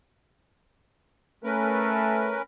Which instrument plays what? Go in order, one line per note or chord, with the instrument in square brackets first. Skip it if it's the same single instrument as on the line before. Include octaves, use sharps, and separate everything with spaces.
[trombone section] A3 [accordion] C#4 A#4 B4